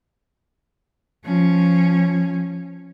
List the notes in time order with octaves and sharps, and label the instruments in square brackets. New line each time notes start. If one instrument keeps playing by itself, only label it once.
[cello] F3 C#4